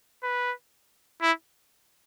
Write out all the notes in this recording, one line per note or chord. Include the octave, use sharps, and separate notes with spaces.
B4
E4